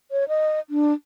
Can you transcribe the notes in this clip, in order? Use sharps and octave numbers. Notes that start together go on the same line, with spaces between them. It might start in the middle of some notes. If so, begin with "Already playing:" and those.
C#5
D#5
D4